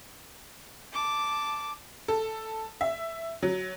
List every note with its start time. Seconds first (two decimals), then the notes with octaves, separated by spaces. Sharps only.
0.93 A5 D6
2.08 A4
2.81 E5
3.42 F#3